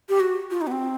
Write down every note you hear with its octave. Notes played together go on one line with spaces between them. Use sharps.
G4
F#4
F4
D#4
B3
C4